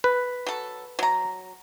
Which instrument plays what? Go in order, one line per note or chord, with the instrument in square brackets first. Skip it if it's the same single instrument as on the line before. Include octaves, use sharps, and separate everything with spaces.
[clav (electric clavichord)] B4
[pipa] F#3 A4
F#3 A#5